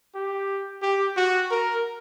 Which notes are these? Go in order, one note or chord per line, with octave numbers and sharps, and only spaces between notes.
G4
G4
F#4
A#4